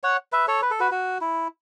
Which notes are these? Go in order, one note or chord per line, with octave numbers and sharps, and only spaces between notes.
C#5 F#5
B4 E5
A4 C#5
B4
A4
F#4 B4
F#4
E4